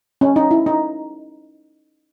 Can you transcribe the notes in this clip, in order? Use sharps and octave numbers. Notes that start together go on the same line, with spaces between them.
C#4
D#4
E4
D#4